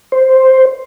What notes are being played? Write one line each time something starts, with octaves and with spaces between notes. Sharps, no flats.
C5